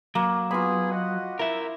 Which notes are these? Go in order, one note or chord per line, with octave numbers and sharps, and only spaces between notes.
F#3 A#3
B3 F4 G#4 B5
F#4 D#5 F#5
E4 A#4 E5